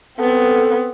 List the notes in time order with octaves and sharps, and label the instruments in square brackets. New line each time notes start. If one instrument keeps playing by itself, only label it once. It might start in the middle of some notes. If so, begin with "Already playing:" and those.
[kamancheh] B3 C4 [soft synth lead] A4